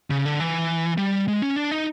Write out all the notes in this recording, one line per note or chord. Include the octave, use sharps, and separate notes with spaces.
C#3
D3
E3
G3
G#3
C#4
D4
D#4